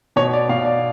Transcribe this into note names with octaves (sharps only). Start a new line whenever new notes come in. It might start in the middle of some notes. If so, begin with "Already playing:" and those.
B2 C#5
D5
B2 F5
D5